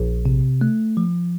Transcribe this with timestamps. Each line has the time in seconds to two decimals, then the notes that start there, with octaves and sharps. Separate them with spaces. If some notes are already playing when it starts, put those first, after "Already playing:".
Already playing: A#1
0.25 C3
0.61 A3
0.97 F3